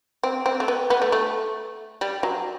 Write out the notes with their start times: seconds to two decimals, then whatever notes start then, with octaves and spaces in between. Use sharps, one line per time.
0.23 C4
0.46 C4
0.60 A3
0.68 B3
0.90 B3
1.02 A3
1.12 A3
2.01 G3
2.23 F#3